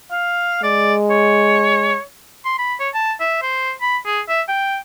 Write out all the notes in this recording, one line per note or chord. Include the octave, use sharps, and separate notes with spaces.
F5
G#3 D5
C#5
C6
B5
C#5
A5
E5
C5
B5
G#4
E5
G5